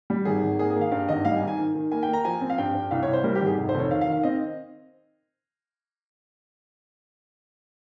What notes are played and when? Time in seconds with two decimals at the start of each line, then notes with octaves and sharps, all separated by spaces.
0.10 G3
0.25 G#1 G#4
0.43 G#1
0.59 A#3 G#4
0.70 G#4
0.76 A#3
0.81 F5
0.92 G2 F5
1.09 G#1 D#5
1.25 G3 F5
1.37 G#5
1.41 G#2
1.47 G#5
1.59 D#3
1.75 D#3
1.92 A#3 G#5
2.03 G5
2.08 A#3 A#5
2.25 F3 G#5
2.41 C4
2.50 F5
2.58 G2 G5
2.74 G2
2.91 C2 F5
3.03 C2 C#5
3.13 C5
3.24 G3 A#4
3.35 G4
3.41 G#1
3.47 G#4
3.57 F1
3.69 C5
3.74 F1
3.80 C#5
3.90 D#3 F5
4.01 F5
4.07 D#3
4.13 F5
4.23 C4 D#5